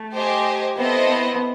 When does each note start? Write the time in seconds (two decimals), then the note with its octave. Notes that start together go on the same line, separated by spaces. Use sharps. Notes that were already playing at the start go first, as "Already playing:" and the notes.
Already playing: A3
0.13 G4 C5 D#5 G#5
0.76 B3 C4 E4 A4 C5 D#5
1.08 B3